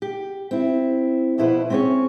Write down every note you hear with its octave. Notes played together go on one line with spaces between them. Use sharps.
G4
C4 E4
F2 B2 E4 B4 C5
C4 C#4 E4 G#4 C#5